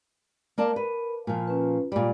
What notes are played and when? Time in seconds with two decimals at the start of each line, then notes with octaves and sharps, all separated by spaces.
0.58 A#3 A#4 D5 A5
0.76 B4
1.27 A#2 F3
1.47 C#4 B4
1.92 A#2 G3 D5